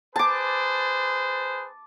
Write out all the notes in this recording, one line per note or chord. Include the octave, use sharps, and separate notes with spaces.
G#4 B4 C5 A5 D6